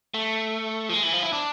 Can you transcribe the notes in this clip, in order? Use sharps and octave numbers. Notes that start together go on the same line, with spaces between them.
A3
F3
G#3
E3
F3
E4
D4